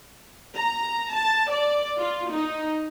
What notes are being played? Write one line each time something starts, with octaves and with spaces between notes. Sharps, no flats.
A#5
A5
D5
F4
D#4